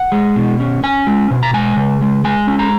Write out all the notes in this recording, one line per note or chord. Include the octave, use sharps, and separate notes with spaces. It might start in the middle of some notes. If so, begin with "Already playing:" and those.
Already playing: F#5
G#3
B2
C#4
C#4 G#5
G#3
B2
A#5
G#3 G#5
C#3
G#3
G#3 G#5
C#4
A#5